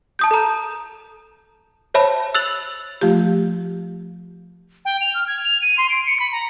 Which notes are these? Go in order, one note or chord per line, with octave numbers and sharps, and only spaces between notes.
A5 D#6 G6
A4 A#5
C5 C#5 E5 A5 B5
E6 F#6 A6 F7 F#7
F3 A3 F4 G4
G5
F7
F6
G#6
F7
D#7
C6
D7
C#7
B5
A#5